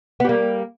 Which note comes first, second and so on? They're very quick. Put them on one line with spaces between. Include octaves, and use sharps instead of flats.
B3 G3 A#3